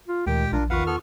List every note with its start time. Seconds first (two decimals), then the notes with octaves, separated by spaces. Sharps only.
0.08 F4
0.27 D2 A#2 D#3 G#3 G4 G5
0.52 A#1 D4 F4 A#4
0.70 E2 D#3 F4 B4 F5 F#5 C#6
0.87 B3 A4 F6